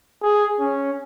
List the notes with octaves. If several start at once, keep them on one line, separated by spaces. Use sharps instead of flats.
G#4
C#4